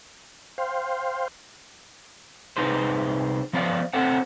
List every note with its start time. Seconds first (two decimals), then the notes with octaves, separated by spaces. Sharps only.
0.58 C5 F5 G5 C6
2.57 C2 D#4 G#4 B4 C5
3.53 F3 B3 C5 D5 F5
3.93 C4 A4 C5 F#5